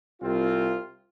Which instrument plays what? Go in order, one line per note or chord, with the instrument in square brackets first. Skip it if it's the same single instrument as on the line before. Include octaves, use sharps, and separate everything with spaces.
[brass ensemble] C2 C3 C4 F4